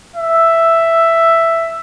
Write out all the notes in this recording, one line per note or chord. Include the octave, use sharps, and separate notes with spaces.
E5